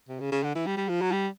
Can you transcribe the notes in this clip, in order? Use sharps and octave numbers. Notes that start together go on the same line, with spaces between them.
C3
C#3
C#3
D3
E3
G3
G3
F3
F#3
G3